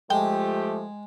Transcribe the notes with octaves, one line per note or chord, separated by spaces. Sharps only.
F3 G#3 A3 G4 G5